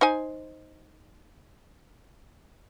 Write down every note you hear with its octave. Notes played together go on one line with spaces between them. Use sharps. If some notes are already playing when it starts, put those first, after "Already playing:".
D#4 C5 G#5